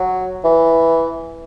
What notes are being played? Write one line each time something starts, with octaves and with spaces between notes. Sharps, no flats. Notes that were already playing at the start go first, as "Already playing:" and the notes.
Already playing: F#3
E3